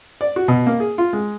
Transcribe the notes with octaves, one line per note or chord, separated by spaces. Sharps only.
D5
F#4
B2
A#3
G#4
F4
G#3